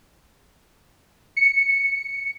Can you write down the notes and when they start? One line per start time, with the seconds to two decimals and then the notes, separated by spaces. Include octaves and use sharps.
1.37 C#7